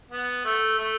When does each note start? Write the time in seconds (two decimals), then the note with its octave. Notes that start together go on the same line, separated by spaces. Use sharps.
0.11 B3
0.45 A3
0.79 A3